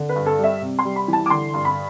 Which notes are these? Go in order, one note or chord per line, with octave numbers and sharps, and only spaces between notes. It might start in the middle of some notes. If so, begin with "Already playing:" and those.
Already playing: D3
B4
G2
A4
G3
E5
C3
C6
G3
B5
E3
A5
D6
D3 C6
G2
B5